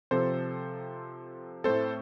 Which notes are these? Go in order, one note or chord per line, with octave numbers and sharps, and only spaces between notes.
C3 F3 C4 A4 C5
A2 A3 C4 A4 C5